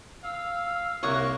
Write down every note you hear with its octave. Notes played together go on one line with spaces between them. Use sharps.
F5 E6
C2 A#3 C#5 D#6 F#6